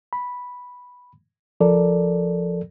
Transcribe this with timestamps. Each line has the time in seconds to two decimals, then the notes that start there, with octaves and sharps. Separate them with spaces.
0.13 B5
1.60 C#2 F3 A4 A#4 D5